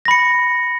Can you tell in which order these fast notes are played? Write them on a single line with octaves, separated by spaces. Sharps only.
A#6 B5 C#7